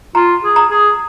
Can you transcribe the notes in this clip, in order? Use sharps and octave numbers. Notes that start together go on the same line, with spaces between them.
F4 A#5
G#4
A#5
G#4